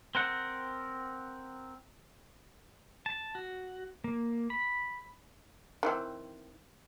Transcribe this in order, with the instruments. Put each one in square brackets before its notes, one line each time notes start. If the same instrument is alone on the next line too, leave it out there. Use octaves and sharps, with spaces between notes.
[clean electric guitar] C4 A#4 F#5
[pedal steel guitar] A5
F#4
A#3
B5
[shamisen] D#3 E3 C4